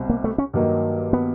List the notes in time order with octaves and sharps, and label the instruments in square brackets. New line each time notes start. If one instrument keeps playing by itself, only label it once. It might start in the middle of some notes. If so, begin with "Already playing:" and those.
Already playing: [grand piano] C2 B2 G3 C4
[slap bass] A#3
A3
C#4
[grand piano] G2 D#3 F#3 A#3 D#4
[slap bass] B3